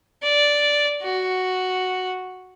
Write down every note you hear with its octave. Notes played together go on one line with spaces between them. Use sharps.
D5
F#4